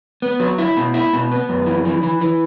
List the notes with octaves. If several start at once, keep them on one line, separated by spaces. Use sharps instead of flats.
B3
F#3
E4
B2
E4
B2
B3
F#2
E3
E3
E3
E3